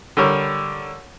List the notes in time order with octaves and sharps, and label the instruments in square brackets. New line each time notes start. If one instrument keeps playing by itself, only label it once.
[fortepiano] D3 G3 A#4 C#5